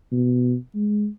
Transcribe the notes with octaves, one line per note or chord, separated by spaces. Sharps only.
B2
G#3